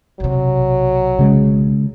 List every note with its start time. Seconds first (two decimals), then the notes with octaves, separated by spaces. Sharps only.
0.20 B1 C3 F#3
1.19 C#3 G#3